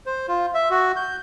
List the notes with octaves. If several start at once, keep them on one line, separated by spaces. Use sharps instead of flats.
C5
F4
E5
F#4
G6